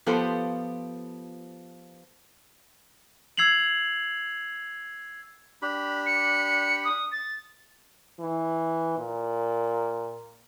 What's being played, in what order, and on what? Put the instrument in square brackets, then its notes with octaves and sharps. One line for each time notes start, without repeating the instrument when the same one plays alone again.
[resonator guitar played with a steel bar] F3 B3 F4 G4 A4 C5
[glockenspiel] E6 G#6 C7 F7 F#7
[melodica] D4 G4 B5
[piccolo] C#7
D#6
A6
[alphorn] E3
A#2